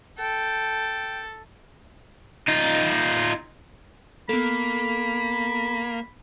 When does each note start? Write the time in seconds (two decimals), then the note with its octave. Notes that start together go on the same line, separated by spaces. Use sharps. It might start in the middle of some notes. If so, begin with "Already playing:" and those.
0.19 A4 G5
2.48 D#4 F4
4.29 A#3 B3 A4 B5